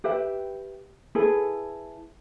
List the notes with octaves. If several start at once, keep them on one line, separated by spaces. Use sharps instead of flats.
G4 B4 E5 G5
E4 G#4 A4 B4